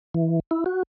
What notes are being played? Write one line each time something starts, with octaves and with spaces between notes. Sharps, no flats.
E3
E4
F#4